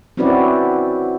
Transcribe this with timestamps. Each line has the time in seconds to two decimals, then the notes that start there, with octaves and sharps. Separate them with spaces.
0.17 C4 C#4 E4 F#4 B4 D5